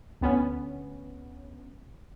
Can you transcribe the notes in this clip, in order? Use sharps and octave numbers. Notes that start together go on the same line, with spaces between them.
D2 B3 C#4